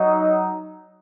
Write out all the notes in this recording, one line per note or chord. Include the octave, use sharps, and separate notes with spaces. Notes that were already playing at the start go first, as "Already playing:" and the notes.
Already playing: F#3 D#4